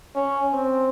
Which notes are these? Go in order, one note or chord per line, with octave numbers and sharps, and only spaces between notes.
C#4
C4